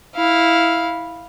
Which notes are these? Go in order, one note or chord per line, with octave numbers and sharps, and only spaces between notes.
E4 F5